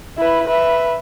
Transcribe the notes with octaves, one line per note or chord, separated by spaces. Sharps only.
E4 B4
B4 E5